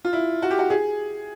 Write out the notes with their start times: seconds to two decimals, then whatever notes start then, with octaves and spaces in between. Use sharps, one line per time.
0.05 F4
0.13 E4
0.42 F#4
0.50 G4
0.59 F#4
0.70 G#4